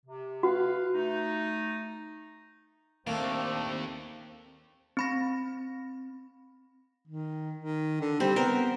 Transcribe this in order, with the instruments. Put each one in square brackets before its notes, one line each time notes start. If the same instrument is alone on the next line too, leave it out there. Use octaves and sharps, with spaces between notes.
[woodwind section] C3
[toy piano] F#4 [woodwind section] B4 F5
[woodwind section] A3 D#4
[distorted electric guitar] D#2 [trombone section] A3 D4 [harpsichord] A#3 [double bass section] C4
[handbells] C4 B5 A#6
[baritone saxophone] D#3
D#3
D3
[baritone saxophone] G3 [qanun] C4
[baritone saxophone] B3 [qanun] A#4 C5